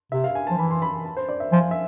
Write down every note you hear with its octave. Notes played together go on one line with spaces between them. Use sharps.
C3 E5
F5
G#5
A5
F3
E3 B5
C6
B5
A5
C5
D5
E5
F3 G#5
F5
E5